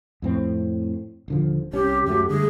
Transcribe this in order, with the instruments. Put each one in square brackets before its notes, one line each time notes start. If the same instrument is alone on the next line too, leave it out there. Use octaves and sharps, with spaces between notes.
[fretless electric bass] F2 A2 C4
D#1 D3 F3
[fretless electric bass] C2 C#4 [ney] G4
[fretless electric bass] F#2 F#3 A3 [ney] G4
[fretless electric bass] D3 G3 A3 [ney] G#4